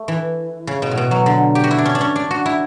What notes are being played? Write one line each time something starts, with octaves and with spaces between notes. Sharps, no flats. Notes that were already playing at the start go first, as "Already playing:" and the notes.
Already playing: A3
E3
C#3
B2
A2
B2
F#3
D3
G4
F#4
E4
D4
C#4
D4
C#4
D4
F#4
E4